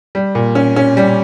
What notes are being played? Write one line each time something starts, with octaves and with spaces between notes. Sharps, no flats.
G3
A#2
C#4
C#4
G3